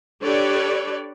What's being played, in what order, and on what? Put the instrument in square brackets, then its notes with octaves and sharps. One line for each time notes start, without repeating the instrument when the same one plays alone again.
[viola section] D4 G4 A4 B4 C#5 D5